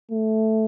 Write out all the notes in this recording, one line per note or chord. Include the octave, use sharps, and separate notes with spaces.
A3